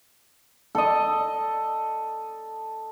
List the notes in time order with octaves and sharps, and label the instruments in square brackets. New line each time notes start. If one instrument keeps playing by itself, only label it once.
[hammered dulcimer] A4 D#5